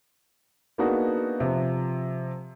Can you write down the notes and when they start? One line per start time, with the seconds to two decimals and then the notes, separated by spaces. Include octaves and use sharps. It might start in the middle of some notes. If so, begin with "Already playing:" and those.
0.78 A#3 B3 D4 D#4 F#4 G#4
1.40 C3 F3